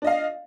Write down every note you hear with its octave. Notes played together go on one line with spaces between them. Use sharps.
D4 D#5 F5